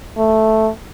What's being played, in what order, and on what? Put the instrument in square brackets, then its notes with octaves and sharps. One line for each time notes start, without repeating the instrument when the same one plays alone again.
[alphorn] A3